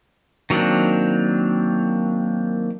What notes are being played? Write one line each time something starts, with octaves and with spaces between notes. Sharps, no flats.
D#3 F#3 A#3 C4 D4